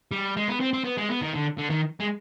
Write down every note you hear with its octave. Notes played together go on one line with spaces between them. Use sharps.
G3
G#3
B3
C4
C4
B3
G#3
B3
D#3
D3
D3
D#3
G#3